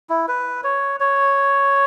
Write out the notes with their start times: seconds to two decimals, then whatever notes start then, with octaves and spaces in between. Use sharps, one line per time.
0.10 E4
0.28 B4
0.64 C#5
1.00 C#5